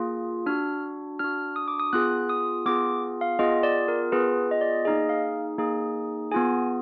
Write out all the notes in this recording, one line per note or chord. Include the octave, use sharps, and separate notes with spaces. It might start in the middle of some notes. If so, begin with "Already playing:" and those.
Already playing: A#3 F4 G#4
D4 F#4 F6
D4 F#4 F6
D#6
D6
D#6
B3 F4 G#4 F#6
D#6
B3 F4 G#4 D6
F5
B3 F4 G#4 D#5
D5
A#4
B3 F4 G#4 B4
D#5
D5
A#3 D#4 G#4 D#5
F5
A#3 D#4 G#4
B3 F4 G#4 G#5